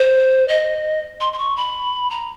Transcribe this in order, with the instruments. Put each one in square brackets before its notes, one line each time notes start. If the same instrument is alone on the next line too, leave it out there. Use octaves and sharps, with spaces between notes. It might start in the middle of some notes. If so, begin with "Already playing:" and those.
Already playing: [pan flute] C5
D#5
C6
C6
C#6
B5
A#5